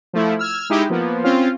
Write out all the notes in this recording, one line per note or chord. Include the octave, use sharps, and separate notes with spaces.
F3 A3 E4
E6 F6 G#6
G#3 D#4 E4 G4
F3 A#3 B3
C4 C#4 F4